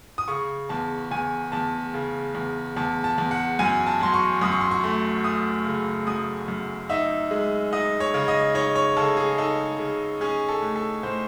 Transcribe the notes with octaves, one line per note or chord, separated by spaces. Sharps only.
D#6
C#3 C#6
E2 A5
E2 G#5
E2 A5
C#3
E2
E2 A5
A5
E2
F#5
F#2 G#5
A5
F#3 C6
C#6
F#2 D#6
C#6
C6
C#6
A3
A3 D#6
C#3
F#2 D#6
F#2
D#4 E5
G#3
D#4 D#5
C#5
C#3
D#5
D#4 C#5
C#5
C#3 A4
G#4
D#4 A4
C#3
C#4 G#4
A4
A2
A4
A2 C5